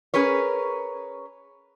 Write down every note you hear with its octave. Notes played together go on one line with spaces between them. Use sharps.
C#4 G#4 A#4 B4 C#5